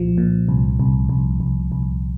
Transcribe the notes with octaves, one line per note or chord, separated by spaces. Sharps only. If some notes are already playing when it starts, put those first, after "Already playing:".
Already playing: C2 A#2 F3
A#2
C2
C2
C2
C2
C2